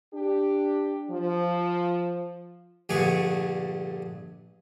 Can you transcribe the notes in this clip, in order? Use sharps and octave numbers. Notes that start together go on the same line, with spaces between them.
D4 G4
F3
A#1 G2 D3 A3 G#4 C#6